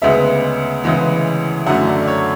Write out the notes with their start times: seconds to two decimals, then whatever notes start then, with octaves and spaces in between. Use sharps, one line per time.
0.02 D2 C#3 G#3 B3 E5
0.84 D2 C#3 E3 G#3
1.67 F#2 D3 F#3 A3 C#4 F#5
1.87 D5
2.02 D5
2.08 C#5